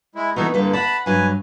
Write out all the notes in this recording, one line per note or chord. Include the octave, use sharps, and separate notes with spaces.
G#3 E4
D#3 E3 B3 D#4 F#4 A4
G2 D3 G3 A#3 B4
D5 F#5 A5 B5
G2 F#3 B4 G#5